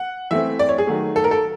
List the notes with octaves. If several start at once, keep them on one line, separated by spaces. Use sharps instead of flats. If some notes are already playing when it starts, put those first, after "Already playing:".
Already playing: F#5
E3 A3 C4 E5
D5
C#5
G#4
D#3 F#3 A3
A4
A#4
A4